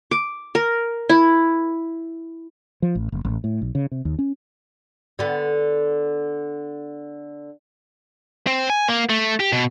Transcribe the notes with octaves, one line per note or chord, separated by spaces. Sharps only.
D6
A#4
E4
F3
A1
F#1
A1
A2
B1
C#3
C3
D#2
C#4
D3 B3
C4
G#5
A#3
A3
G4
B2